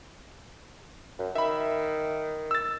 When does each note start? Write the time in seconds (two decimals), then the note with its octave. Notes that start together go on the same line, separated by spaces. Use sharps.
1.19 F#2
1.35 D#3 E5 B5
2.51 E6 A6